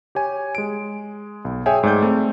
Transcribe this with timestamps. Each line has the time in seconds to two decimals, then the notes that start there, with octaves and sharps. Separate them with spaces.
0.15 G4 C#5 G#5
0.55 G#3 D7
1.45 B1
1.66 G#4 C#5 E5 G5 G#5
1.83 G#2 A3 D5 G6
2.02 A3 C4